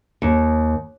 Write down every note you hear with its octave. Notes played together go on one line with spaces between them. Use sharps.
D#2